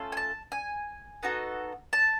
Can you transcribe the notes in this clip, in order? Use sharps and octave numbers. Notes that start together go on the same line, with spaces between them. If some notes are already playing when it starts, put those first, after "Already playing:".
Already playing: A3 C#4 F4 A4
G#5
A5
G#5
B3 D#4 F#4 A4
A5